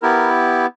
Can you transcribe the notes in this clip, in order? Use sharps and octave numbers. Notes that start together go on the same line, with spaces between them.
B3 E4 G4 A#4